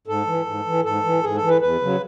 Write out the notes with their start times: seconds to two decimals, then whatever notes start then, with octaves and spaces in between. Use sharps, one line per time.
0.07 G#2 A4
0.27 E3
0.46 G#2
0.66 E3
0.84 G#2 A4
1.04 E3
1.23 G#2 G#4
1.36 A4
1.43 E3
1.48 B4
1.61 E2 B4
1.81 C#3 F#3